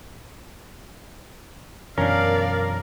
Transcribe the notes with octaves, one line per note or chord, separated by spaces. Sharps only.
F#2 B2 E3 C#4 D4 A#4 D5 F5